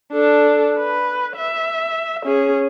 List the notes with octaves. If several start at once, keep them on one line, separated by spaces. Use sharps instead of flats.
D4 A4
B4
E5
C#4 G#4